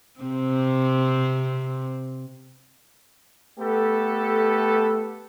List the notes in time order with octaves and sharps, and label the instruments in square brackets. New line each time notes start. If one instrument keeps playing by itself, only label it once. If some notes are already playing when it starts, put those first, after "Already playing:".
[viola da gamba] C3 C4
[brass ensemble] A3 B3 G4 A4